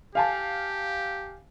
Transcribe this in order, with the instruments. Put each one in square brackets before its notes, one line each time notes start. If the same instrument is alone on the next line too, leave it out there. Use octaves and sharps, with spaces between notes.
[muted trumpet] G4 [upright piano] F5 G#5 A5